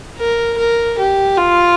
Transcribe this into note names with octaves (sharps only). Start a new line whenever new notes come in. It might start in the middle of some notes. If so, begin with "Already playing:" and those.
A#4
A#4
G4
F4